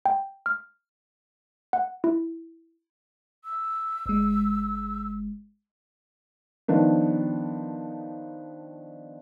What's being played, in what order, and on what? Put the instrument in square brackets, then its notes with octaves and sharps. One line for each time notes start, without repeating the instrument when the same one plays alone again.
[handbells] G5
F6
F#5
E4
[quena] E6
[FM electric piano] G1 G#3
[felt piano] D#3 F3 B3 D4 D#4